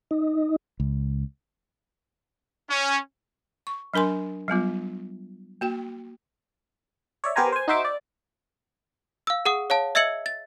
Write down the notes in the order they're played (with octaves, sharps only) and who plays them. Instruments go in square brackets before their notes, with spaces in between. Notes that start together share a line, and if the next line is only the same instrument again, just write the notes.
[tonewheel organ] D#4
[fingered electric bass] C#2
[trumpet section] C#4
[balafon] C#6
F#3 D4 A#4 G#5 C6
F#3 G3 B3 F4
A#3 F#4 G5
[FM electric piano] C#5 D5 E5
B3 G4 A#4 C5 G#5 A#5
C5 G#5
D#4 F#4 C5 E5 D6
D5
[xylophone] F5 E6
G#4 F#5 D#6
C#5 F5 A5
D#5 E5 E6 G#6 C#7 F#7
A6